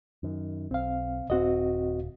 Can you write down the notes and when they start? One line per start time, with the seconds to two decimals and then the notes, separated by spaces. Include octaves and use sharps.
0.23 F#2 D#3
0.71 B1 C4 F5
1.30 D#1 C4 F#4 D#5